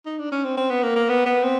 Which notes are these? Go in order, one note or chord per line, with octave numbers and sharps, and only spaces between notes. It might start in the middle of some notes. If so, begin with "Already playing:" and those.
D#4
D4
C#4
C4
C4
B3
A#3
A#3
B3
B3
C4